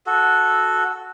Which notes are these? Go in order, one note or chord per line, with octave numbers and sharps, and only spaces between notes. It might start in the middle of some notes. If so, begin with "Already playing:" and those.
F#4 A4